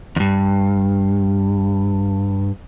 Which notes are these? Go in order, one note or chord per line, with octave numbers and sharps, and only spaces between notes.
E2 G2